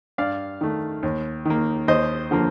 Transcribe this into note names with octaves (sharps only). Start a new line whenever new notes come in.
G2 D5 F5
D#3 A3
D#2
D#3 A#3
D#2 C5 D#5
D3 F3 A#3